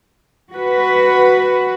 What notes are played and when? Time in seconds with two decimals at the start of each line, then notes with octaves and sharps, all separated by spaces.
0.53 F#4 B4